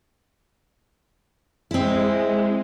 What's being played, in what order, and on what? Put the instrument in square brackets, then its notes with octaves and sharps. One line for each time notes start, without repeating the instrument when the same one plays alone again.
[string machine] G#3 [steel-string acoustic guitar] C4 E4